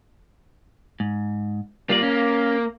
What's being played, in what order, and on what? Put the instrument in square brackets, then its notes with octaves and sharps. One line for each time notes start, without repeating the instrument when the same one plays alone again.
[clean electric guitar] G#2
[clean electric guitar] G3 F4 D5 [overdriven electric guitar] A#3
[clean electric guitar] C#4